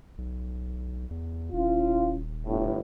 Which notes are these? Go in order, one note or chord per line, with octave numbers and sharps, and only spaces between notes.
B1
E2
D#1 C#4 E4 F4
G1 A2